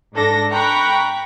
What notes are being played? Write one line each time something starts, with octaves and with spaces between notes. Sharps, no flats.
G#2 D4 A4 A#6
G5 A#5 B5 C#6 F#6